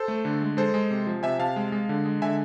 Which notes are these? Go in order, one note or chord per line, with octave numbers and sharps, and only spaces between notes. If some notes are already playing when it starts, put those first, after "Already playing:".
Already playing: A4 C5
A3
D3
G#3
G#3 A4 C5
G#3
C3
F3
C3 E5 G#5
C3 F5 A5
G#3
G#3
D3
G#3
D3 E5 G#5